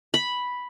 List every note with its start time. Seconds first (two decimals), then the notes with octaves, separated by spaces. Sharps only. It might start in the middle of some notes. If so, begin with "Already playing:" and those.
0.14 B5